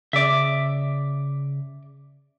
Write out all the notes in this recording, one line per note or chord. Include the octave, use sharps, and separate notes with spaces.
C#3 D5 E5